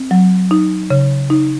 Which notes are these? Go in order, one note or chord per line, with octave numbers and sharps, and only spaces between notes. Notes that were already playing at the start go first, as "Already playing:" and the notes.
Already playing: C4
F#3
D#4
C#3
D#4